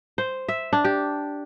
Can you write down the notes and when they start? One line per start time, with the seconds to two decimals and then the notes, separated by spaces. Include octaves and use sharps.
0.18 C5
0.49 E5
0.73 D4
0.85 G4